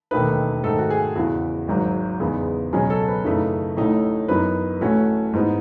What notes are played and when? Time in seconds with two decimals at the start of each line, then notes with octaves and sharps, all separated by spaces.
0.11 E1 D#2 D#3 A3 D#4 B4
0.63 G#2 D#3 A3 D#4 A4
0.79 F#4
0.90 G#4
1.16 E2 C#3 E3 F#4
1.68 G#1 G#2 F#3
2.20 E2 C#3 G#3 B3 D#4
2.73 C#2 B2 F#3 C#4 G#4
2.90 A4
3.08 B4
3.24 F#2 C#3 E3 A3 D#4
3.77 A1 A2 E3 A3 D#4
4.28 F#2 E3 B3 D#4 B4
4.81 A1 A2 E3 A3 C#4 F#4
5.33 G#2 E3 B3 D#4